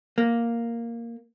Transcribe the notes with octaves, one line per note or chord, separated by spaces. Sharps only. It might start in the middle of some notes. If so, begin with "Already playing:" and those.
A#3